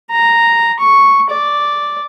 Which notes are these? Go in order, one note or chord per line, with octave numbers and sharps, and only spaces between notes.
A#5
C#6
D5